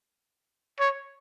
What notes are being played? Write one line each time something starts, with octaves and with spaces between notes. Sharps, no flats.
C#5